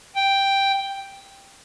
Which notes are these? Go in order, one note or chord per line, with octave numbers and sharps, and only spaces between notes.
G5